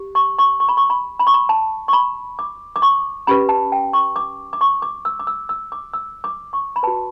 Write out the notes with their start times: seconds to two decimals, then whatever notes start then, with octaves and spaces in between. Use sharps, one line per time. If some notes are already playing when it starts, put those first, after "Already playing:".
Already playing: G4
0.15 C#6
0.38 C#6
0.60 C#6
0.68 B5
0.77 C#6
0.90 B5
1.19 B5
1.27 C#6
1.34 B5
1.49 A5
1.88 C#6
1.93 B5
2.39 D6
2.76 D6
2.82 C#6
3.27 C#4 G4 B4 B5
3.49 A5
3.72 G5
3.93 C#6
4.16 D6
4.53 D6
4.61 C#6
4.82 D6
5.05 E6
5.19 D6
5.27 E6
5.49 E6
5.72 D6
5.93 E6
6.24 D6
6.53 C#6
6.76 B5
6.83 B4 A5
6.87 F#4